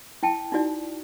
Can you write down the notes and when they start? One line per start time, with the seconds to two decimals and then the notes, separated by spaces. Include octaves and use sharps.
0.23 E4 G5 A5
0.52 D#4 E4 F#4 D5